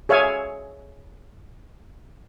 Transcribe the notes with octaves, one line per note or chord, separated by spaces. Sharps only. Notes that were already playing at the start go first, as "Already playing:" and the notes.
G#4 C#5 E5 F5 G#5